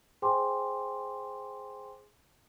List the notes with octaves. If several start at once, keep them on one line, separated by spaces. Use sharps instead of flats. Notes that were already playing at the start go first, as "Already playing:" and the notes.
G#4 C5 G5 G#5 C6 D6